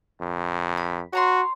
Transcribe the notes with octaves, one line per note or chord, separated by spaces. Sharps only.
F2
B5
F#4 C#5 A#5 C6